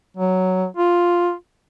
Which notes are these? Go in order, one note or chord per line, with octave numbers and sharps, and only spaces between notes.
F#3
F4